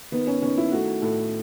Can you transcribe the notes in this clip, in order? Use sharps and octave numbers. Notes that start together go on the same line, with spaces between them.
D#3 B3
C#4
D#3 C#4
E4
A3 F#4
A2 A4